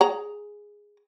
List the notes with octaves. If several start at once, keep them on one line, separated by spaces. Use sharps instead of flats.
G#4 A#5